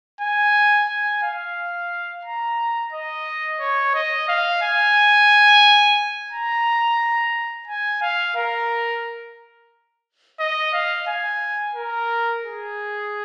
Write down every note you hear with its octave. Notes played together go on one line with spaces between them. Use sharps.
G#5
G#5
F5
A#5
D#5
C#5
D#5
F5
G#5
A#5
G#5
F5
A#4
D#5
F5
G#5
A#4
G#4